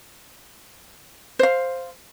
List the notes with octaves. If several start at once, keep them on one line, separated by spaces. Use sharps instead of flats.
C5 F5